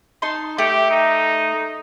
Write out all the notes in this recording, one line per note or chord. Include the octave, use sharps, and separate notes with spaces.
D#4 A5 C6
A3 G4
D#4